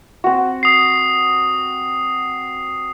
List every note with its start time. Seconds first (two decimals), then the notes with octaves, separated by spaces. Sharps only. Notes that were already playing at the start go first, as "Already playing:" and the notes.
0.24 C4 F#4
0.63 D#6 C7